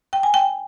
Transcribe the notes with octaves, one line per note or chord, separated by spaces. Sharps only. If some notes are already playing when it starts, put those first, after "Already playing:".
G5
G#5
G5